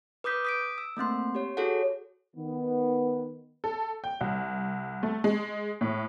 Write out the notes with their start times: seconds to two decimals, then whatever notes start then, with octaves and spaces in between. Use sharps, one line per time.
0.24 B4 D6 D#6 G6 B6
0.45 D#6 B6 D7
0.78 E6
0.97 A3 A#3 C4 C6
1.35 G4 C#5
1.57 F#4 G#4 A4 C#5 F#5
2.36 D#3 B3
3.64 A4
4.04 G5
4.21 C2
5.03 A3
5.24 G#3
5.81 A2